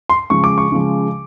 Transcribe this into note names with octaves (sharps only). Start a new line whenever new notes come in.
C6
C#3 F3 G#3 C#6
D6
C#6
C#3 F3 G#3